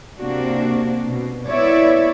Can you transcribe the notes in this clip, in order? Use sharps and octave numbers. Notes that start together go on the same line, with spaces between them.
C3 A#3 D4 F#4
B2
B3 E4 C#5 D5 E5